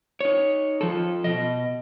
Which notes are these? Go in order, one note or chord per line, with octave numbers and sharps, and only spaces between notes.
D#4 C#5
F3 A4
B2 D#5